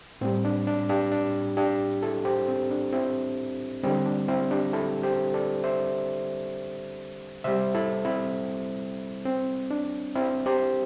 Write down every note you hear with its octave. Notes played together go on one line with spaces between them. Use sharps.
A2 G3 C4
D4
D4
D4 G4
D4
D4 G4
E4 A4
G4 C5
C4
D4
C4 E4
D3 G3 C4
D4
C4 E4
D4 G4
E4 A4
G4 C5
A4 D5
C5 E5
C3 G3 C5 E5
E4 A4
C4 E4
C4
D4
C4 E4
G4 C5